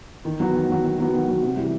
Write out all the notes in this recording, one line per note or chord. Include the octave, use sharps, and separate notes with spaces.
D#3
F#3 B3 F#4
D#3
F#3 B3 F#4
D#3
F#3 B3 F#4
D#3
F#3 B3 F#4
C3
E3 G3